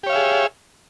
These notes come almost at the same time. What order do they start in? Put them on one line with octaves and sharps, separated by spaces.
G4 C#5 F5 E5 G#4